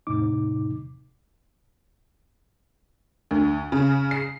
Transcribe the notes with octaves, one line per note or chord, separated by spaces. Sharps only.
E2 A2 C3 D#4 D6
D2
C#3
C7